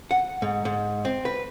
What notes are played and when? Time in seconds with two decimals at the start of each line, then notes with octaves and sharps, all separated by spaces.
0.11 F#5
0.42 G#2
0.65 G#2
1.05 C4
1.25 B4